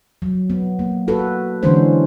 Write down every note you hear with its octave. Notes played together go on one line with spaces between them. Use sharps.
F#3
B3
A#3
F#4 A4 B4
D3 E3 G#3 C#4 D4 C5